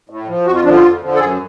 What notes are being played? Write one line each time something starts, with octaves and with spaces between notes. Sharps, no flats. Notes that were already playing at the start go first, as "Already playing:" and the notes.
A2
F3
F2 F#4
F4
D3 F3 D4
F4
F2
D3 F3
A4
F#2 G#4